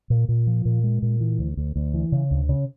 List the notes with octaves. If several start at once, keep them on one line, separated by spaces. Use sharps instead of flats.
A#2
A#2
F3
A#2
G#3
A#2
E3
D2
D2
D2
E3
C#3
D2
C#3